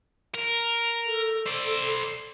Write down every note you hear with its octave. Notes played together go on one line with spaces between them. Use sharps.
A#4
A4
C5 D5